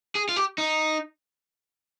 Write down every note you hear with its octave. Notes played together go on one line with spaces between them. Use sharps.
G#4
F4
G4
D#4